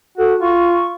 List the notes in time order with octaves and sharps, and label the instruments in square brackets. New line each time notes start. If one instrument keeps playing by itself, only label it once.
[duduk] F#4 [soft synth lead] A4
[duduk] F4 [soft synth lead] C#6